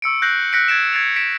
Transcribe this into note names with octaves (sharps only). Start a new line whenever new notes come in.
C#6 E6 C#7 D7
F#6 G6 A#6 C7 D7 F#7
F#6 G6 A#6 B6 C#7 D7
G#6 A6 D7 E7
F#6 G#6 A6 C7 D7 F7
B6 D7 E7